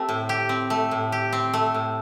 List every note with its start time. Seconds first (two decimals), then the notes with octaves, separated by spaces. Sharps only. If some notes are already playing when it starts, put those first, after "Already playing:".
Already playing: A3 C4 G4
0.09 A2
0.29 G4
0.49 C4
0.70 A3
0.91 A2
1.12 G4
1.33 C4
1.54 A3
1.74 A2